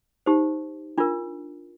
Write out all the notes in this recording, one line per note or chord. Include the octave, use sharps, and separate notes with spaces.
D#4 G4 C5
D4 F4 A#4